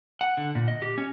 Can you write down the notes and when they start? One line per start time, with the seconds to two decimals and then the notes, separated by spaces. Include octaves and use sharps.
0.21 F#5
0.37 D3
0.55 A#2
0.68 D#5
0.82 G4
0.98 C#4